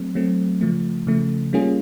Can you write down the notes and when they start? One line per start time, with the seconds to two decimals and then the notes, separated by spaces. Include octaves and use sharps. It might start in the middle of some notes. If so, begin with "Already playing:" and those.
Already playing: F#3 A3 C4
0.15 F#3 A3 C4
0.61 C#3 F3 A3
1.07 C#3 F3 A3
1.53 G3 A#3 C#4 F4 G#4